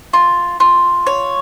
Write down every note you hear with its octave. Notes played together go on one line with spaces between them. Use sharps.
F4
F4
C#5